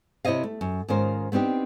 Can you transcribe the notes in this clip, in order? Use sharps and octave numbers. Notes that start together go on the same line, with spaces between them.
C3 E4 C5 C#5 D#5 F5
A3
F#2
G#2 D#3 C#4 F4 A#4 C5
B3 C4 D4 D#4 G4